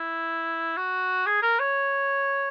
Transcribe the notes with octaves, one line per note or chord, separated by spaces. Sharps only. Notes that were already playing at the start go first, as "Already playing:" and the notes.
Already playing: E4
F#4
G#4
A#4
C#5